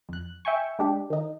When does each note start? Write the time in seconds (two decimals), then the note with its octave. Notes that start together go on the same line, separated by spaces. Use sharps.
0.09 F2 F#6
0.45 E5 G5 G#5 C#6
0.79 G#3 D4 G4
1.10 D#3 D#4